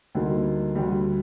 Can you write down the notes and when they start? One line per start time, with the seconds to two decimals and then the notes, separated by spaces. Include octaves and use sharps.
0.15 D2 D3 G3 A#3 D#4
0.75 D2 D3 G3